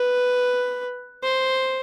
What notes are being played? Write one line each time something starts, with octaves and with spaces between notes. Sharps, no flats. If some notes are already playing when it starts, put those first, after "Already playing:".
Already playing: B4
C5